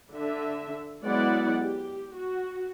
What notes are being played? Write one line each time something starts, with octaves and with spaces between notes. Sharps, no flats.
D3 E5
F#3 G#3 B3 E4 D5 F#5
G4
F#4